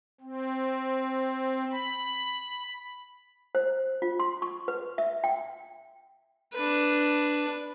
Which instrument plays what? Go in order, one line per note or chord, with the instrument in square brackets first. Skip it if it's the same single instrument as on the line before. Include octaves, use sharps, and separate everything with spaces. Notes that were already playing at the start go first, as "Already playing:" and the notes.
[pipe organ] C4
B5
[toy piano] C5
F4
C6
C#6
B4
E5
G5
[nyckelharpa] D4 B4